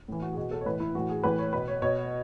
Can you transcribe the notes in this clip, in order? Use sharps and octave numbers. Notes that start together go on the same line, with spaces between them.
A2 E3
F#4
G#4
B2 F#4
A4
C#5
A2 E3 B4
E4
A2 E3 F#4
G#4
A2 E3 B4
C#5
B2 B4
C#5
B2 C#5